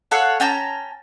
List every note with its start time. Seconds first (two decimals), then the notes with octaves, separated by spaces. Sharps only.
0.11 A4 C#5 F5 F#5
0.40 C#4 G5 A5 A#5